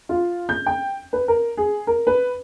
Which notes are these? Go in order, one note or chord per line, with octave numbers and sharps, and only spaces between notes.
F4
G6
G5
B4
A#4
G#4
A#4
B4